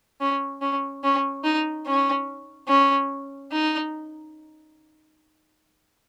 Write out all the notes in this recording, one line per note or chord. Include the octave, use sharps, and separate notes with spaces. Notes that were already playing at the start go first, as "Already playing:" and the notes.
C#4
C#4
C#4
D#4
C#4
C#4
D#4